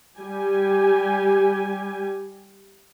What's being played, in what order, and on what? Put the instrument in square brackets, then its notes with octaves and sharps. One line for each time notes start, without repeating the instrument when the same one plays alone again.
[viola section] G3 G4 G#5